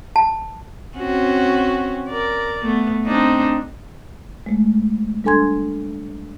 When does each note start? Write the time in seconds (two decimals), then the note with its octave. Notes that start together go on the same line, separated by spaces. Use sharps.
0.16 A5
0.97 C4 C#4 F#4
2.09 A#4 D5
2.63 A3 B3
3.05 C4 D4 D#4
4.46 G#3 A3
5.24 G3 D4 A4 G#5 C6 G#6